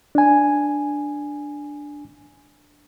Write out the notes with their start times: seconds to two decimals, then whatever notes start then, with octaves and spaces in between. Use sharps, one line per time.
0.15 D4 G#5